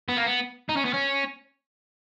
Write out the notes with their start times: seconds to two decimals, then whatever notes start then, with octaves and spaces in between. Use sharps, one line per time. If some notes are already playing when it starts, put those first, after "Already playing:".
0.09 B3
0.17 A#3
0.26 B3
0.69 D#4
0.77 C#4
0.85 B3
0.94 C#4